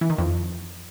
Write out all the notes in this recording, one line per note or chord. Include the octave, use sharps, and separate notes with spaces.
E3
D#3
F2